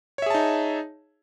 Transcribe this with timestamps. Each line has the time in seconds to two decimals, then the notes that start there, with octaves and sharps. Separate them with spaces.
0.18 C#5
0.22 E5
0.26 G#4
0.30 A5
0.34 D#4